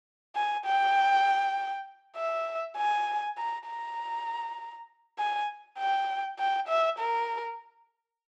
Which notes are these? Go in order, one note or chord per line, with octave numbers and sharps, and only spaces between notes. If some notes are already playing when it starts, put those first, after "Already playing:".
G#5
G5
E5
G#5
A#5
A#5
G#5
G5
G5
E5
A#4